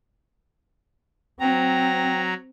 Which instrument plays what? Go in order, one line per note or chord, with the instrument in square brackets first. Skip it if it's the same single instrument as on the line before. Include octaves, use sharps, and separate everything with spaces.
[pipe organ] F#3 A#5 [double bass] C4 [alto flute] G5